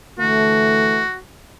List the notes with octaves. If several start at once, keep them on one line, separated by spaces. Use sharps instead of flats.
D3 E3 A3 F#4